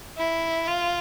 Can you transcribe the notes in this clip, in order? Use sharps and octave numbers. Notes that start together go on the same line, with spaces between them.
E4
F4